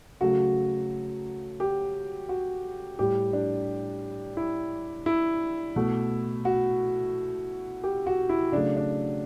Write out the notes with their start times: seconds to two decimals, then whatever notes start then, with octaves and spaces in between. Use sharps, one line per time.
0.21 C#3 F#3 A3 F#4
1.60 G4
2.29 F#4
2.99 A2 G3 G4
3.33 D4
4.37 E4
5.06 E4
5.76 B2 A3
6.45 F#4
7.83 G4
8.07 F#4
8.29 E4
8.52 C#3 F#3 A3 D4
8.77 D4